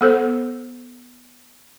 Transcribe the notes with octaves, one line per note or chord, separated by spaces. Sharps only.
B3 A4 C5